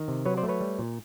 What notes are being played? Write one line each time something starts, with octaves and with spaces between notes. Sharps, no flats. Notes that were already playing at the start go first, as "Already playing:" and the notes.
Already playing: D#3
C3
F#3 B4 C#5
C5 D5
A3
B4 C#5
G3
A#2